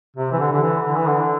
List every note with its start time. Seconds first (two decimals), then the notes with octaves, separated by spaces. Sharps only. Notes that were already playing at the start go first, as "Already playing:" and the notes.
0.17 C3
0.32 E3
0.40 D3
0.52 D3
0.62 E3
0.86 D3
0.97 E3
1.07 D3